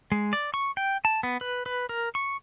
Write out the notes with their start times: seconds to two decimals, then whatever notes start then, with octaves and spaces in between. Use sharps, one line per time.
0.12 G#3
0.33 D5
0.54 C#6
0.77 G5
1.05 A5
1.23 B3
1.41 B4
1.66 B4
1.89 A#4
2.15 C#6